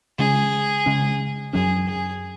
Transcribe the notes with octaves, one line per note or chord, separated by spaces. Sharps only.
C#3 G#3 C#4 G#4
C#3 G#3 C#4
F#2 F#3 C#4 G#4
G#4